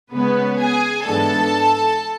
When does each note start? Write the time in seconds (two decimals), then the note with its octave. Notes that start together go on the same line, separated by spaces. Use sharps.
0.12 C#3 G#3 B3 C#4 B4
0.58 G#4 G#5
1.04 G#2 E3 G#3 B3 D4 A4 A5